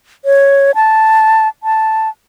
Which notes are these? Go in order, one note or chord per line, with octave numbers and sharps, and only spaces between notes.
C#5
A5
A5